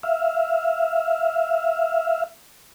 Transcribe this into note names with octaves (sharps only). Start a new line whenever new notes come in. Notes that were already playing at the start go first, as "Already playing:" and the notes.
E5 F5